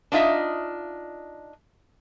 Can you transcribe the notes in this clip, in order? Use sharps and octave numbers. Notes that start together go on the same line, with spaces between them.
D4 D#4 F4 D#5 E5